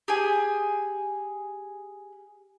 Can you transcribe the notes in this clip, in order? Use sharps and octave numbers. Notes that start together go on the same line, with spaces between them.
G4 G#4 G#5